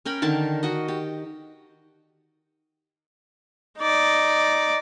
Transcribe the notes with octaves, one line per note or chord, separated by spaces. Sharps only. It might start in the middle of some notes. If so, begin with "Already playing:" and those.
C#4 A#4 G5 B5
D3 D#3 A#4 A5
F#4 D#5
G4
D#4 D5